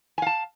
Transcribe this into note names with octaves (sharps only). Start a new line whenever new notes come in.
F5 G#5 A5